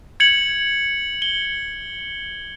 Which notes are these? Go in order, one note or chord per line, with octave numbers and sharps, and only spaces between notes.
G#6 C#7 F#7
G7